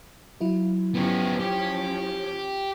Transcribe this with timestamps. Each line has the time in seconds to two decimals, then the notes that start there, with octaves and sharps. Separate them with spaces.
0.40 F#3 E4 F4
0.95 F3 B3 C#4 G4
1.40 G4